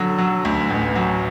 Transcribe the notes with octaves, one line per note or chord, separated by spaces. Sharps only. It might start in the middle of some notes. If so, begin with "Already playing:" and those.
Already playing: D3 F#3
F#3
D2
A1
F#3